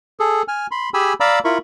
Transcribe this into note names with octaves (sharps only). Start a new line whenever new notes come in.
G#4 A4
G#5 F6
B5 C6
G4 G#4 G#5 B5 E6
D5 F5 A#5 B5 D6 E6
E4 F4 A#4 B5 C#6